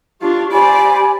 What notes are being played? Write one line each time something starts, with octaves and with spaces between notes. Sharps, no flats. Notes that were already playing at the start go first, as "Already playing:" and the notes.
D4 F4 G4 C#6
G4 C5 D5 G#5 B5